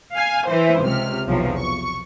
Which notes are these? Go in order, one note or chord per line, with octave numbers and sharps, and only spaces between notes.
F5 G#5
E3 C5
C#2 C3 F6
B1 E2 C3 F3 F#3
C#6